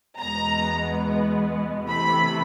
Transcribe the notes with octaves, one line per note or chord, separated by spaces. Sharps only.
E2 B2 G#3 B3 A#5
C3 E3 A3 B5